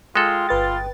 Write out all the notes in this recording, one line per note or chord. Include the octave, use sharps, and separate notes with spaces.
G#3 F4 A4 G5
G1 F4 B4 A6